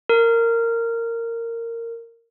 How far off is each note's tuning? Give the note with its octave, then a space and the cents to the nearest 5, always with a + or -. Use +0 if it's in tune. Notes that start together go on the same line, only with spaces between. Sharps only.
A#4 -15